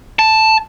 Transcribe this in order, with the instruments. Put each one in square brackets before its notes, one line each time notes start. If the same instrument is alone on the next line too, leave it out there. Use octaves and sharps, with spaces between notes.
[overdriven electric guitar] A5